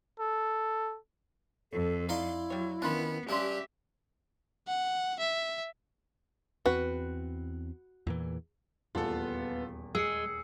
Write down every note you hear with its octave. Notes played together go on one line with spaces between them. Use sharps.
A4
F2 A4
D#4 E4 D5 F5 C6
F#3 G3 C#5
D#3 B3 C#4 D4 F4 B5
G2 C#3 C#4 D4 G4 E5 C6
F#5
E5
E2 C4 F#4 B4
E2 A#2 E3
D#1 E2 B3 F4 A4
G#3 G#4 E6 C7 C#7